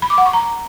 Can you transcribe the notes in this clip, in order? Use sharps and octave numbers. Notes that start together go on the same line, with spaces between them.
B5
D6
F#5
C#6
A#5